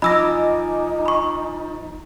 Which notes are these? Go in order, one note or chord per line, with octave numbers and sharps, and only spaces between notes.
F3 D#4 D#5 G#5 B5 D6 E6 A#6
B5 C#6